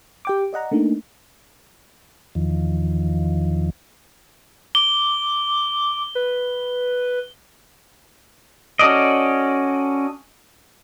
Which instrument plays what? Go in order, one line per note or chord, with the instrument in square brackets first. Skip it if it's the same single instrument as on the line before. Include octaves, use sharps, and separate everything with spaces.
[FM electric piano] G4 G5 D6
D5 D#5 F#5 A#5
A3 A#3 D4 D#4
[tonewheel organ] E2 D#3 F3
[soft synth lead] D6 [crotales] G7
[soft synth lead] B4
[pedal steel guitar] C#4 F#4 A4 D5 D#5